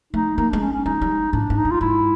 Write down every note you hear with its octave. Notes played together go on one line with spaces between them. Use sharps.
A3 D#4
A#3 D#4
G#3 D4
C#4
C#4
G#3 D#4
G3
A2 D4
G#2
D#4
G2
F4
G#2 E4